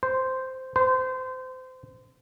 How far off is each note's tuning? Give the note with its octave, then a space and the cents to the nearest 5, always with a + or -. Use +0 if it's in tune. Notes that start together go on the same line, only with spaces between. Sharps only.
C5 -5
C5 -25